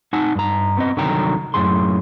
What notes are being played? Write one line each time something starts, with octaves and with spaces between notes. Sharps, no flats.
D#4 F#5 G#5 A5
G2 A#5
B3 C4 D#5
C2 D3 D#3 F#3 G5 A#5
F#2 A2 G#4 C6